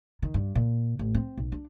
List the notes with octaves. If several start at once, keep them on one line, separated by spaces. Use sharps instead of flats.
D#3
G2
A#2
A1
C4
B1
D4